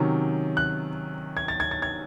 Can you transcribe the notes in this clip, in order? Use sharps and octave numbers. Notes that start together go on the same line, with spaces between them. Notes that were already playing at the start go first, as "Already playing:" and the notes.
Already playing: C3 D#3 F#3 C#4
F#6
G#6
A6
G#6
A6
G#6